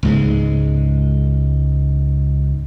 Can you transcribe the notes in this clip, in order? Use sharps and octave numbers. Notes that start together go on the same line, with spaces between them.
C#2 G#2 G#3